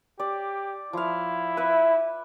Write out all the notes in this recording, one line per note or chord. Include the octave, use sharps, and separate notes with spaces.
G4 D5
F3 E4 F5
B4 E5